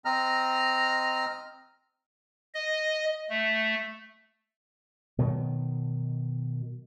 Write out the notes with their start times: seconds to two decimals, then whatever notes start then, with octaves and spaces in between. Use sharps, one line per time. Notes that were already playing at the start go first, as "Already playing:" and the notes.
0.05 C4 D#5 A#5 F6
2.54 D#5
3.30 A3
5.18 B2 D#3 F#3